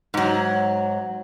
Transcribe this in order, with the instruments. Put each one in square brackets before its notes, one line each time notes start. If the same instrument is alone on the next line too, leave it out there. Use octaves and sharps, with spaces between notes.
[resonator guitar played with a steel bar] G#2 F#3